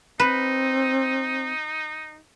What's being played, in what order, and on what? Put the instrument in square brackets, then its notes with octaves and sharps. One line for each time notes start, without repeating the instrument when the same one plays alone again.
[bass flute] C4 [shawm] D#4 [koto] B4